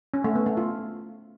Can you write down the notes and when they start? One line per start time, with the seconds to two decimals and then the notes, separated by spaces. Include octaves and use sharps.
0.14 C#4
0.24 A3
0.35 B3
0.46 A3
0.57 F4